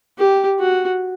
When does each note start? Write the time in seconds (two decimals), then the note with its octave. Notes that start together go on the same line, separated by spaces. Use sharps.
0.18 G4
0.59 F#4